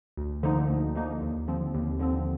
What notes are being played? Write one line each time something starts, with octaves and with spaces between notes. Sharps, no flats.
D2
D3 F3 A#3 D#4
D2
D3 F3 A#3 D#4
D#2
D3 F3 C4
D#2
D3 F3 C4